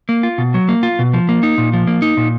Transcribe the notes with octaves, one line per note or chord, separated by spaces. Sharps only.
A#3
F4
B2
F#3
A#3
F4
B2
F3
A#3
D#4
A#2
F3
A#3
D#4
A#2